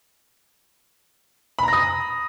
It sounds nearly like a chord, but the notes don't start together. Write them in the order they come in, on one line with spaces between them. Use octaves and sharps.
B5 A#5 A#6 D#6